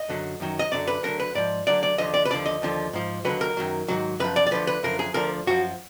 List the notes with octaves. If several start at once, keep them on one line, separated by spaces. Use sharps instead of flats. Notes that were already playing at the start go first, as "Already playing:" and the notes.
Already playing: D#5
F#2 D3 F#3
F#2 D#3 F#3
D#5
F#2 D3 F#3 D5
B4
D2 D3 F#3 A#4
B4
G#2 F3 D5
D2 D3 F#3 D5
D5
D#2 D3 F3 D#5
D5
B4
D#2 D3 F3 D5
D#5
D#2 D3 F3
G#2 F3
D#2 D3 F#3 B4
A#4
F#2 D#3 F#3
G#2 D#3 F#3
F#2 F3 B4
D5
D5
D2 D3 F3 B4
B4
F#2 D3 F3 A#4
G#4
D2 D3 F3 A#4
F#2 F3 F#4